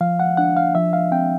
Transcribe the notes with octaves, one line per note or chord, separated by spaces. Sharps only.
F3 F5
F#5
D4 F#5
F5
F3 E5
F5
C4 G5